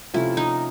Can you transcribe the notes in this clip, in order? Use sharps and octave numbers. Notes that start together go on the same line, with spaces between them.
C3 F3 A3 C#4 E4 F4
D#4